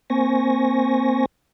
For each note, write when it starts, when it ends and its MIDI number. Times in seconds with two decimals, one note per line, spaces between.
0.10 1.26 58
0.10 1.26 60
0.10 1.26 72
0.10 1.26 80
0.10 1.26 85
0.10 1.26 94